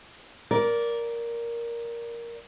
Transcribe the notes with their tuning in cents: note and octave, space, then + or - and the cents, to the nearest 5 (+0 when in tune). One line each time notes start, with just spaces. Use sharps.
A#4 +5 D5 -15